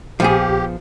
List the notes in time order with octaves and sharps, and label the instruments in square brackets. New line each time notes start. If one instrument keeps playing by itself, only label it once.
[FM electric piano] A#1 [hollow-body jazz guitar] F3 B3 G#4 [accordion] G4